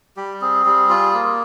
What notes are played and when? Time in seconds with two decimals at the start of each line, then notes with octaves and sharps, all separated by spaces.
0.17 G3 G4
0.41 C4 G#4
0.66 G3
0.90 F4
1.14 A#3